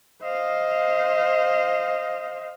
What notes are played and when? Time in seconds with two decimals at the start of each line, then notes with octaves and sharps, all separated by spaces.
0.23 C5 D#5 F5